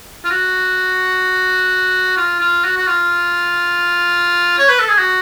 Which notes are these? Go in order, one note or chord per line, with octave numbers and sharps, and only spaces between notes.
F4
F#4
F4
F4
F#4
F#4
F4
C#5
B4
A4
G#4
F#4